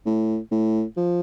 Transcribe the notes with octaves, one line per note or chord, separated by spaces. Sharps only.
A2
A2
F3